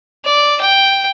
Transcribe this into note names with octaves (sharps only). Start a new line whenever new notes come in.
D5
G5